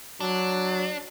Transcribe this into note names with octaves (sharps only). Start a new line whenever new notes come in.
F#3 D4